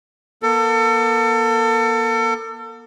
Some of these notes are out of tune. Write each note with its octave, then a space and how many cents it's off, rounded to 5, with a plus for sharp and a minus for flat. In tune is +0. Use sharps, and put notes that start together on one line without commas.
A#3 +45 A4 +35